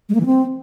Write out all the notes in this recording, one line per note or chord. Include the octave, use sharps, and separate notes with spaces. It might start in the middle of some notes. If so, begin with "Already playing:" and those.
G#3
A#3
E3
C4